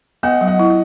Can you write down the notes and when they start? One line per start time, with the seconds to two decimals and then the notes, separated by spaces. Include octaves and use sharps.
0.23 B3 D#5 F#5
0.41 F#3
0.47 D#5 F#5
0.59 E4